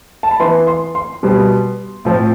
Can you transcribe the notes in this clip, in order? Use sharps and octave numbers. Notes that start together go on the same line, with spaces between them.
A5
B5
E3 B3 C6
C6
C6
B2 G3 B3
A2 F3 C4